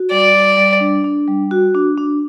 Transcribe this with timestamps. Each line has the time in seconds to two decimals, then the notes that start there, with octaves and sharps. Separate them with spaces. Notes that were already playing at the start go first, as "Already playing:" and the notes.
Already playing: F#4
0.11 G3 D5
0.35 G3
0.57 G3
0.80 D4
1.04 D4
1.27 G3
1.51 F#4
1.75 D4
1.97 D4